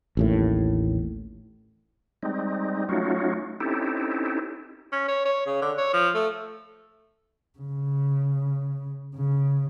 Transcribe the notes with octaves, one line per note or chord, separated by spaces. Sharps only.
A1 D#2 A2
G3 G#3 C4 D#4
F#3 A3 C#4 D#4 F4 F#4
C4 C#4 D#4 E4 G4 A4
C#4
C#5
C#5
C#3
D3
C#5
F3
A3
C#3
C#3